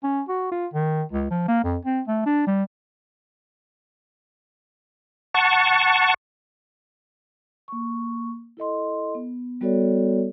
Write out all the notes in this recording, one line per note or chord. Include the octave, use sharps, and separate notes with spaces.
C#4
F#4
F4
D#3
C#2
F3
A#3
F2
C4
A3
D4
G3
F#5 A5 C#6
A#3 C#6
E4 A4 D#5 C6
B3
G3 B3 F#4 A4 C#5 D5